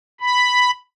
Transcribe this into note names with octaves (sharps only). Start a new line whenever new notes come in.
B5